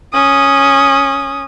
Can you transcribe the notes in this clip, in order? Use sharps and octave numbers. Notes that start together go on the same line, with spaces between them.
C#4 D#6